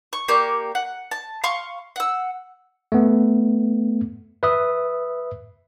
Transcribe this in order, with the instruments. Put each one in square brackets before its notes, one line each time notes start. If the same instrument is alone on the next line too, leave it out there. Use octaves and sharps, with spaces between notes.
[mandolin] C#6
A#3 G4 D5 C#6
F#5
A5
F5 C6 C#6
F#5 E6
[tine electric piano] A3 B3
B4 E5 D#6